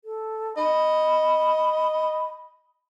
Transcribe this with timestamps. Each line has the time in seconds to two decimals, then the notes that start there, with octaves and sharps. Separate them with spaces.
0.05 A4
0.57 D#5 B5